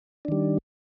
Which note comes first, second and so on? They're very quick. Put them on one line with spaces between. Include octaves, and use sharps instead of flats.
D4 D#3 G3